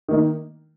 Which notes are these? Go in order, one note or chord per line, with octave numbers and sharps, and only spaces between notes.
D#3 A#3 D#4